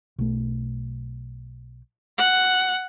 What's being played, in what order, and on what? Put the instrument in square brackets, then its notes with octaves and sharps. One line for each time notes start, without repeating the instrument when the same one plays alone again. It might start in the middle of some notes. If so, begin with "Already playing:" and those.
[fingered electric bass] B1 A3
[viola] F#5